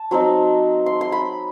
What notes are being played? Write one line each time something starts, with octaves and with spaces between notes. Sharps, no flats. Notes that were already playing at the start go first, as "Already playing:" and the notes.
Already playing: A5
F#3 C4 D#4
C6
C6
B5